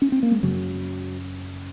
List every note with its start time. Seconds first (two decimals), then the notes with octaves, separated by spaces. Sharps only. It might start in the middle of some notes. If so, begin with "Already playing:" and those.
0.02 C#4
0.12 C4
0.23 A#3
0.32 G#3
0.43 F#2 C#3 F#3